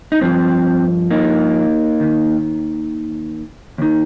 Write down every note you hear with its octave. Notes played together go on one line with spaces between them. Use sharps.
D#4
G2 F3 C4
A#3 D#4
D#2 D#3
D#2 D#3